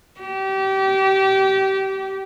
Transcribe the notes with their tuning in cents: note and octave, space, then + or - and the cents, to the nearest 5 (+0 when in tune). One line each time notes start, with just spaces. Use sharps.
G4 -25